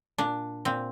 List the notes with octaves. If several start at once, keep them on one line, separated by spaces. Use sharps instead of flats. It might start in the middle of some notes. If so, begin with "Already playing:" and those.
A#2 D4
A#2 C4